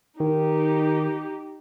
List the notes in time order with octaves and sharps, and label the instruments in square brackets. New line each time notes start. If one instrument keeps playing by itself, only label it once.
[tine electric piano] D#3 [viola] D#4 G4